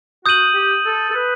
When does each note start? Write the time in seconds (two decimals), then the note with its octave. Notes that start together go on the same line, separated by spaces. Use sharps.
0.25 F#4 D#6 G6 D#7 F#7
0.55 G4
0.85 A4
1.10 A4
1.15 B4